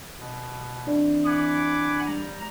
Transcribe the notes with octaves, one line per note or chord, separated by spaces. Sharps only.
B2
E3 C4 D4 D5
F#5 G#5 B5 D6
G3 A#5